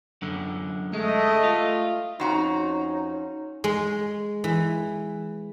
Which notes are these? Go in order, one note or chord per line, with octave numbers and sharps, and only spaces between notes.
F#2 D3
G#3 A3 D#5
F4
F2 C#4 D#4 F#4 A#5
G#3
E3